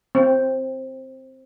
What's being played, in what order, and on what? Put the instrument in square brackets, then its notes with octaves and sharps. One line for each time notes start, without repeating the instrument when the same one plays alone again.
[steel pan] C4